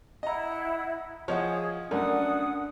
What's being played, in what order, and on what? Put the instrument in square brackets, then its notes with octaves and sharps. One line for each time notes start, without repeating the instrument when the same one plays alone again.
[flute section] E4 F#5 [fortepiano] D#5 A#5
[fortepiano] F3 [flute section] G#4 [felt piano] C#5 D#5 F#5
[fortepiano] F#2 A3 [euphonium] D4 [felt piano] A#4 [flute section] F#5 D#6